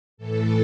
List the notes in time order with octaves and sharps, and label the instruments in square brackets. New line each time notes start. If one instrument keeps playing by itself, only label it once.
[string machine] A2 E3 A4